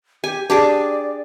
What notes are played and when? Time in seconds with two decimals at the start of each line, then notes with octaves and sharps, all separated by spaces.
0.24 G4 G#5
0.50 D4 G4 G#4 D5